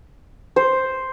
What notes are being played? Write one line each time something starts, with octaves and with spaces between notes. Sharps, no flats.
C5